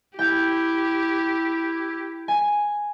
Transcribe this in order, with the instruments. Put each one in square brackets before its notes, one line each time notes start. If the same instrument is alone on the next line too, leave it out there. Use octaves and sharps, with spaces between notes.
[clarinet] E4 [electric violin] G4 [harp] G5
[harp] G#5